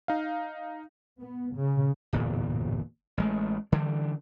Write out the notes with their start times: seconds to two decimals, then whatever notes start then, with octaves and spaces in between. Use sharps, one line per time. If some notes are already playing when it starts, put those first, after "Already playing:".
0.08 D#4 F5
1.19 B3
1.55 C#3
2.13 D1 G1 E2 A#2
3.18 A1 G#3 A3
3.72 D3 E3 G3